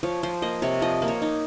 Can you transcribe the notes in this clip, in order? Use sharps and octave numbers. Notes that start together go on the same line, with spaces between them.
F3 C#5
F3 C5
A#3 D#5
C3 C#5
F3 D#5
A#3
C#5
D#4